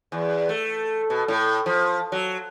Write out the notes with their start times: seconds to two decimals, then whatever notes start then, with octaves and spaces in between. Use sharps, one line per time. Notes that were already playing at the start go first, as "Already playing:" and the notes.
0.12 E2
0.49 A3
1.10 B2
1.28 A2
1.66 F3
2.12 F#3